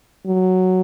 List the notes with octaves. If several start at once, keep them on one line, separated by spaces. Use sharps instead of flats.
F#3